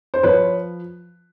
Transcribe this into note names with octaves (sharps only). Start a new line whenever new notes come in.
C5
F3 B4 C#5